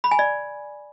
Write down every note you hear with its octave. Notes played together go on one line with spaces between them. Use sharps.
B5
G#5
D5